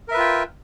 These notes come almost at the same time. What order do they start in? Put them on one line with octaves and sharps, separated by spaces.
A#4 E5 B4 F4 G5